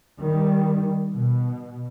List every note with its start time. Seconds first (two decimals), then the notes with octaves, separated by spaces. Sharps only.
0.21 D#3 G3
1.12 B2